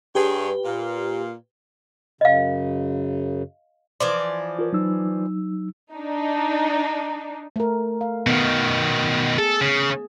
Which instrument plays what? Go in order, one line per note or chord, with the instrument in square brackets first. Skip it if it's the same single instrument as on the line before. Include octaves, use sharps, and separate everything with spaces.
[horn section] G2 G#4 C#5 [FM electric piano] G4 B4
[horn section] A#2 F5
[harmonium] F#2 C#3 [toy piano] D#5 F5
[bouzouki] E3 F3 D5 [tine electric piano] C6
[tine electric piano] F4 A#4 B4
F#3 D#4 E6
[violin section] D4 D#4
[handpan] A3 A#4
F5
[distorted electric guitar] B2 D#3 [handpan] B3
[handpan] G#4 [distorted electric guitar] A4
[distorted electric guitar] C#3